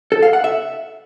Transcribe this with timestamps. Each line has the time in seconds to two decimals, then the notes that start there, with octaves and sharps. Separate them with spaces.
0.12 A4
0.23 F5
0.33 F#5
0.44 E5